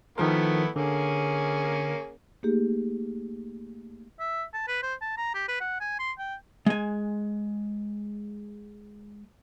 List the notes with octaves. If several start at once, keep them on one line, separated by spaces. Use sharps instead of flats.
D#3 F3 A3 B3 E4 A#4
D3 A#3 C#4 G#4
A3 A#3 D#4 G4 G#4
E5
A5
B4
C5
A5
A#5
G4
B4
F#5
G#5
C6
G5
G#3 G#5